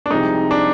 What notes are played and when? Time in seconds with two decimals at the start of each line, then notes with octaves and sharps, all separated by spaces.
0.06 D4
0.11 C2 C3 F3 G#3 D#4
0.51 D4